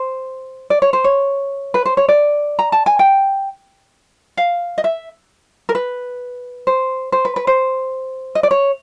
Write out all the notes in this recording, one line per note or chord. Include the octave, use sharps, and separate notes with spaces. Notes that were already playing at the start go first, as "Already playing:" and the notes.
Already playing: C5
D5
C#5
C5
C#5
B4
C5
C#5
D5
A#5
A5
G#5
G5
F5
D#5
E5
A#4
B4
C5
C5
B4
B4
C5
D#5
D5
C#5